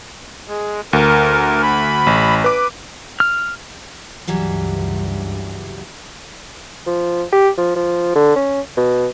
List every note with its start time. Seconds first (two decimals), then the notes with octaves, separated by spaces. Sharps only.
0.47 G#3
0.93 D2 A#4
1.63 B5
2.07 A1
2.44 B4 D6
3.20 F6
4.28 C#2 G2 E3 F#3 G3
6.86 F3
7.32 G4
7.57 F3
7.75 F3
8.15 D3
8.35 C#4
8.77 B2